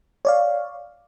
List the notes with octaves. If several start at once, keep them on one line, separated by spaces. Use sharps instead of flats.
C#5 D5 F5